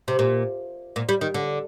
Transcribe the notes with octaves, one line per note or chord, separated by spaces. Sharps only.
C3
A#2
A#2
G3
D#3
D3